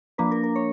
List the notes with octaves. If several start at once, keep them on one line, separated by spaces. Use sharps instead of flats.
F3 A#3 D4 B4
A#4
A#4
C#5